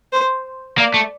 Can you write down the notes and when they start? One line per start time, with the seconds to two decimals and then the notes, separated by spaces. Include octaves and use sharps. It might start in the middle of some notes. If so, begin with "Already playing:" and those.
0.12 C5
0.78 A#3 D5
0.94 A3